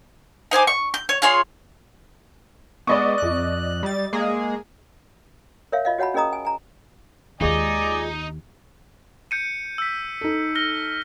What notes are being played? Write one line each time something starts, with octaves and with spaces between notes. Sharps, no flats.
D#4 C5 G#5 D6
C#6
G6
C#5
F4 G#4 C#5 C6
G#3 B3 D5 D#5 C#6
F2 F#6
G3 A6
G#3 A#3 G#4
A#4 C#5 E5 F5
F4 D#5 F5
F#4 C#5 F#5 A5 B5
C#4 G#4 A#4 D#5 A#5 D#6
G#5
G#5 A#5
D#2 D#3 G#3 D#4 F4 D5 D#5 G#5
G6 C#7 D#7
E6 B6
D#4 A4
F6 A#6 G7